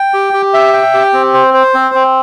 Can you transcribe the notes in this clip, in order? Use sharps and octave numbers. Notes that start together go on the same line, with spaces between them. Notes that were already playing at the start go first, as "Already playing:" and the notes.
Already playing: G5
G4
G4
E5
G5
G4
C4
C5
C5
C4
C4